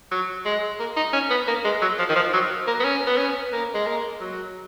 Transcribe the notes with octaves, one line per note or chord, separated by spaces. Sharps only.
F#3
G#3
A#3
D#4
C#4
B3
A#3
G#3
F#3
F3
D#3
F3
F#3
A#3
B3
C#4
B3
C#4
A#3
G#3
A#3
F#3